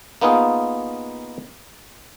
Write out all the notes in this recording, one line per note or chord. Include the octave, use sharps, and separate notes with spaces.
A#3 B3 D#4 F4 G#4